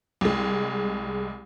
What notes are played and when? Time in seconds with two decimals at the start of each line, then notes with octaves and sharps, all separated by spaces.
0.21 C2 G#3